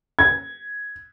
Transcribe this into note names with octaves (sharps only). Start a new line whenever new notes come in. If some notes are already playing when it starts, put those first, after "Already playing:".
G#6